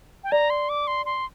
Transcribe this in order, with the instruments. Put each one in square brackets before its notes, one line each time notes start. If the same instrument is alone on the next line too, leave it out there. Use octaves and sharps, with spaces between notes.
[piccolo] G5
[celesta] D5 [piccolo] A#5
[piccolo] C6
D6
C6
C6